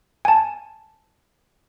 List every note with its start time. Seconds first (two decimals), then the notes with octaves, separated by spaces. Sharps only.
0.25 G#5 A5